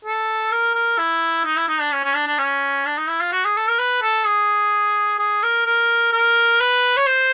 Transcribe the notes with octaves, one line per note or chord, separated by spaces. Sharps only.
A4
A#4
A#4
E4
D#4
E4
D#4
D4
C#4
C#4
D4
D4
C#4
D4
D#4
E4
F4
F#4
G#4
A4
A#4
B4
A4
G#4
G#4
A#4
A#4
A#4
B4
C#5
C5